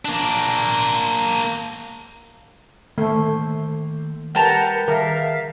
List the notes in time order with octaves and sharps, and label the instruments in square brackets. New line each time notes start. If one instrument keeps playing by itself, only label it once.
[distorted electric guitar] A#3 D4
[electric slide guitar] D#3 A#3 C5 [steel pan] A3
[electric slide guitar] G3 G4 [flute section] A#4 B4 F#5 [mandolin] G5 A5 A#5
[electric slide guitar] D#3 G#4 [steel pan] A#4 [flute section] E5 F5